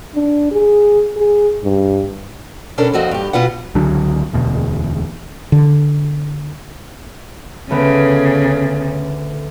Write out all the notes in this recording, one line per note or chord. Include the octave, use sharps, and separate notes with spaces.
D4
G#4
G#4
G2
B2 C#4 D4 A4 A#4
F2 F3 C4 F#4 D#5
G2 G4
B2 F4 B4 F#5
C#2 D3 F#3 D4
E1 D2 B2
D3
D2 C#3 B3